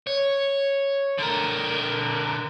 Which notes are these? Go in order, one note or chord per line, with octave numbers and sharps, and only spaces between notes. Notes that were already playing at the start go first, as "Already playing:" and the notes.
C#5
D3 A#4